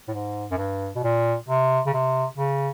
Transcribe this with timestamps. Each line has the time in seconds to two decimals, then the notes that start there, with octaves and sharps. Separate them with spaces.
0.08 A2
0.14 G#2
0.51 F#2
0.58 G2
0.95 B2
1.04 A#2
1.48 C3
1.86 C#3
1.94 C3
2.38 C#3